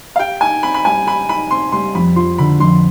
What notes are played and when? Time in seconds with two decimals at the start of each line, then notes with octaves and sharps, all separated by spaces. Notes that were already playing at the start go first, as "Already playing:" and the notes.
0.16 F5
0.19 G4 G5
0.41 D#4 G#5
0.63 C4 B5
0.74 B5
0.85 G3 G#5
1.06 G4 B5
1.28 D#4 B5
1.51 C4 C6
1.72 G3 C6
1.95 F2 B5
2.16 F3 C6
2.38 D3 B5
2.59 F2 C6